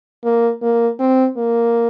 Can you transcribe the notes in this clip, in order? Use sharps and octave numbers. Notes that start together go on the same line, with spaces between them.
A#3
A#3
C4
A#3